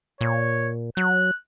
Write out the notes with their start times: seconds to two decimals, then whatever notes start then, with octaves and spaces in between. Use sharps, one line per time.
0.21 A#2 C#5
0.97 F#3 F#6